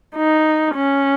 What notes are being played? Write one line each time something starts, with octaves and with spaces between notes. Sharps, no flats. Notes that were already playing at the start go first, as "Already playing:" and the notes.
D#4
C#4